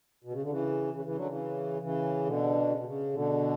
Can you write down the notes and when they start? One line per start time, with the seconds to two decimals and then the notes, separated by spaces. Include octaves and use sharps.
0.24 B2
0.33 C#3
0.42 D3
0.50 C#3 E3
0.94 C#3 E3
1.05 C#3 E3
1.15 D3 F#3
1.27 C#3 E3
1.82 C#3 E3
2.26 B2 D3
2.69 C#3
2.77 B2
2.84 C#3
3.13 B2 D3